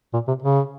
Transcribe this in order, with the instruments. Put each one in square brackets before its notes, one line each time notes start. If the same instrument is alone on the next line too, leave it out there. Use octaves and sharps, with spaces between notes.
[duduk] A#2
C3
C#3